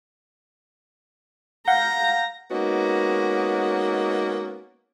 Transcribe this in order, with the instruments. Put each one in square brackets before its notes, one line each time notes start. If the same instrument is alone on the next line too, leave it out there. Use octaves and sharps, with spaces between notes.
[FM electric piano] F5 F#5 G6 [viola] A#5
[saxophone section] G#3 A#3 B3 C#4 D#4 F#4